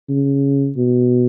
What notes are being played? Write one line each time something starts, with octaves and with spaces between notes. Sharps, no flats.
C#3
B2